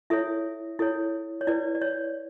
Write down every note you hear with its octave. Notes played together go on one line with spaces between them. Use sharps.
E4 A4 C#5 E5
E4 A4 C#5
C#5
E4 B4 D5
D5
C#5